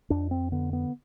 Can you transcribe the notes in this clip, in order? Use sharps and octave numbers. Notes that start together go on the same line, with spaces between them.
F2 D4
C4
D3 B3
B3